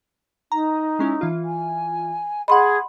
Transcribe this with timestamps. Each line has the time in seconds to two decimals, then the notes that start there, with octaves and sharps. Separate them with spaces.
0.52 D#4 A#5
0.99 G#3 C#4 E4
1.21 E3 F4
1.44 G#5
2.48 G#4 D#5 F#5 B5 C6